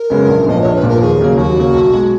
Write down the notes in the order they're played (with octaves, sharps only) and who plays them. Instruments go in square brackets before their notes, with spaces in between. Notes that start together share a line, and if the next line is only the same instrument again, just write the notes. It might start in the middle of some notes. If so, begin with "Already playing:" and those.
Already playing: [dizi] A#4
[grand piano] F#2 C#3 G#3 B3
A#1
[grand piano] A#2 F3 B3 [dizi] D#5
[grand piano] A#1 [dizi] C#5
[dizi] B4
[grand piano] A#2 F3 B3 [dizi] A#4
[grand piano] D#2 [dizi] G#4
[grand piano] C#3 F#3 A#3
[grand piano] D#2 [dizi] F#4
[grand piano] C#3 F#3 A#3
B1
B2 G#3